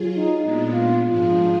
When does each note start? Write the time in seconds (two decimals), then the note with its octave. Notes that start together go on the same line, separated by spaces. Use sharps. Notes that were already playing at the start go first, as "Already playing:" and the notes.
Already playing: F#3 F4 G#4
0.16 D#4
0.39 A#2 G#3 B3 D4 D#4
0.72 F4
1.06 G#2 F3 G#3 D4 F4 G#4